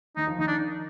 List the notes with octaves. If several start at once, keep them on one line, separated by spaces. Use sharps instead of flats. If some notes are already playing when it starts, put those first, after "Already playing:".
D#3 D#4
F3
D#3 D#4
D4